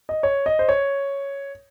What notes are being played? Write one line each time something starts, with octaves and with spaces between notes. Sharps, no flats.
D#5
C#5
D#5
C5
C#5